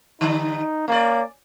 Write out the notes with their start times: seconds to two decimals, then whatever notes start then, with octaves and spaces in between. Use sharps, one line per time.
0.21 D3 G3 D#4
0.88 A#3 C#4 D5